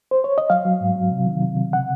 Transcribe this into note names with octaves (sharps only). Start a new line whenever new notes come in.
C5
C#5
D#5
F#3 F5
F#3
G#2
F#3
C3
D#3
C3
C3
C#3 F#5